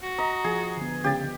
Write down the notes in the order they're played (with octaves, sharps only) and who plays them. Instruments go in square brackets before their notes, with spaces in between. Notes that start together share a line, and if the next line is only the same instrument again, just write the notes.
[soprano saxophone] F#4
[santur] D#5 [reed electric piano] A#5
[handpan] F3 [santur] G#4
[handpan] D3 B3
[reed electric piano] C#2 C#3 A6 [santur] G4